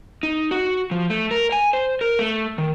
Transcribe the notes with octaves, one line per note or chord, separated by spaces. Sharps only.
D#4
F#4
F3
A3
A#4
G#5
C5
A#4
A3
D#3